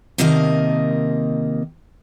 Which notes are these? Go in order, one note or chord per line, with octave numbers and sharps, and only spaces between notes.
C3 D#3 A#3 A#4 D#5 A5